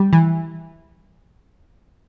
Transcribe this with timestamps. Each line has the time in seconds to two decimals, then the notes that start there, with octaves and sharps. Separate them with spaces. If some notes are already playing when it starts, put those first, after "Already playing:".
Already playing: G3
0.13 E3